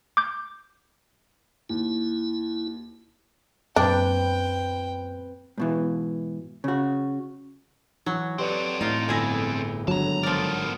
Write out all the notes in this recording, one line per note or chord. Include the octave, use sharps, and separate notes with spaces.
D6 G6
D#2 E4
F#2 A#2 C4 D4 B4 G5
G#2 B2 E3
C#3 F#4
E3 F#3
C4 G4 A4 B4 D5
A2 D#4 F4
G1 E4 G#4 A#6
G#1 D3 F#3 A5 A#5
F3 B3 A#4 D5